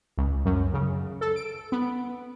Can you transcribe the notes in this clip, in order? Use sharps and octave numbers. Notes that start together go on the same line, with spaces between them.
C#2
F#2
C#3
A4
D7
B3